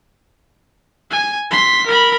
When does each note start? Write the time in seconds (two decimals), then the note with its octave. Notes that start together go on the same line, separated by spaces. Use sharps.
1.10 G#5
1.51 C6 B6
1.86 A#4 B5